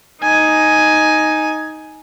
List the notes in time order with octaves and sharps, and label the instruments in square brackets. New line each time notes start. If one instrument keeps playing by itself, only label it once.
[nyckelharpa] D#4 G#5